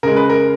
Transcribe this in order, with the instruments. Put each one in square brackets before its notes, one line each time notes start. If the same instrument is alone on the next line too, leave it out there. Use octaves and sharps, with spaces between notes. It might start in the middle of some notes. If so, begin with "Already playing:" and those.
[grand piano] C#3 G#3 A#4
B4
A#4